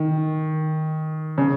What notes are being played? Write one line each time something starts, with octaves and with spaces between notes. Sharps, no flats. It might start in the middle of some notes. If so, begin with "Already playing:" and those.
Already playing: D#3
C#3